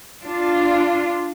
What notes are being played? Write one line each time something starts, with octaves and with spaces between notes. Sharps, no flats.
D4 F4